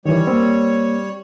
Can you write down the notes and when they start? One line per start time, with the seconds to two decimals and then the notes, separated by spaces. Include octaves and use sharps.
0.06 D#3 E3 G3 C#5
0.27 A#3 C4